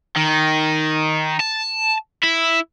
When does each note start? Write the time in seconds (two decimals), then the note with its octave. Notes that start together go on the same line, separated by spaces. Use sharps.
0.16 D#3
1.40 A5
2.23 E4